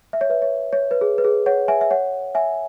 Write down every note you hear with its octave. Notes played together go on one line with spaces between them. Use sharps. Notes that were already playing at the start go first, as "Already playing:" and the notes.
E5
C#5
B4 E5
C#5
C#5
B4
G#4
B4
G#4
C#5 F#5
E5 G#5
E5
C#5 F#5
E5 G#5